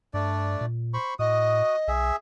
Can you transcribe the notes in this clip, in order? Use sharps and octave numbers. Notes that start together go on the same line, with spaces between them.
G2 A3 D4 D5
A#2
C5 B5 C#6
A2 F#4 D#5 D#6
B1 G#4 E5